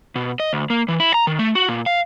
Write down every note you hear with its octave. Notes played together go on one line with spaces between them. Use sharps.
B2
D#5
D2
A#3
E3
E4
A#5
D#3
A3
F#4
A#2
F5